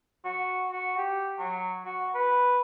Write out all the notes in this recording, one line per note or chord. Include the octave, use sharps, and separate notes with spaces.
F#4
F#4
G4
F#3
F#4
B4